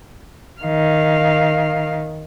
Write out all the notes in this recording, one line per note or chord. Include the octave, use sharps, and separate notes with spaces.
D#3 F5